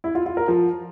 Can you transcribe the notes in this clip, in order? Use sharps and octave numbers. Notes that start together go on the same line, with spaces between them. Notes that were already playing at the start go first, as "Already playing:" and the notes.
E4
F4
F4
A#4
F3